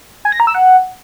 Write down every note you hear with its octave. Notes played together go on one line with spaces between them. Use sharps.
G#5
A#6
A#5
E6
F#5